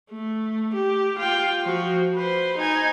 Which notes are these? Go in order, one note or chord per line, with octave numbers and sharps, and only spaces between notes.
A3
G4
F4 G5
F3 F#4
B4 C5
D#4 G#5